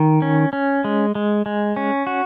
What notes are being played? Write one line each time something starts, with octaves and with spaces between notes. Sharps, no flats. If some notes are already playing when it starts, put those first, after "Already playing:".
Already playing: D#3
C#4
C#4
G#3
G#3
G#3
C#4
F#4